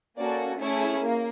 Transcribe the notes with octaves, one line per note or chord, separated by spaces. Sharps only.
A#3 C#4 F#4 A4 D5
A3 C#4 E4 G#4 C#5
A#3